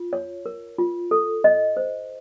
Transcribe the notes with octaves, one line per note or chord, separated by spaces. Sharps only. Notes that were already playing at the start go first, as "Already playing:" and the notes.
Already playing: F4
C#5
A#4
F4
A4
D#5
C5